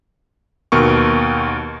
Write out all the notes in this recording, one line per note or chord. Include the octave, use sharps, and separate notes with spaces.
D#2 B2 A#4 C#6